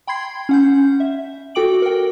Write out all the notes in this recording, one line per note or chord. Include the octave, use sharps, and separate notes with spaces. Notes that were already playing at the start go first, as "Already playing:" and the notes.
G5 B5 C6 G#6 C7
C#4 F#5 G6
E5
F#4 A4 G5 D6 D7 F#7
A#4 G5